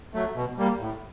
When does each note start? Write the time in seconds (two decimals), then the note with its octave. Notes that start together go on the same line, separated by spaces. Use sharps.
0.14 F#3 A3
0.36 B2
0.58 G3 A#3
0.80 A2